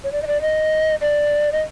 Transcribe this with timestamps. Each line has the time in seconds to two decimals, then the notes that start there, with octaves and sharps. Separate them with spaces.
0.04 C#5
0.12 D5
0.22 D#5
0.27 D5
0.42 D#5
1.01 D5
1.52 D#5